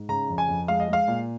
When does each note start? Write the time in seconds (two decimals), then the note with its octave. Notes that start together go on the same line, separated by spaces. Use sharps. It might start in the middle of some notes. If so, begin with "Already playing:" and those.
Already playing: G#2
0.09 C#3 A#5
0.29 F2
0.38 G#5
0.48 F2
0.68 G#3 F5
0.80 D#5
0.88 G#3 F5
1.08 A#2